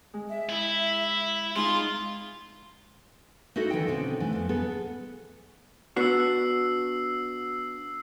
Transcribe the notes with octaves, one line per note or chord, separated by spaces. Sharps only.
G#3
E5
E4
G#3 D#4 F4 C6
D#4 E4 F#4 A4 E5
D#3 E3 A4 G5
B2 D3 C4 C#4 D#4
E3 A3
F2 B3
B3 G#4 A4
B3 D4 F#4 E6 C7